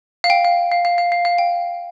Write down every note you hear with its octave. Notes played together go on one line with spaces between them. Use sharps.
F5
G5
F5
F5
F5
F5
F5
F5
G5